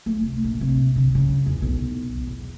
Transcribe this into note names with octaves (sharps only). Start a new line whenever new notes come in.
A3
C3
A#1
C3
D3
C#3
E2
B1
D3
E2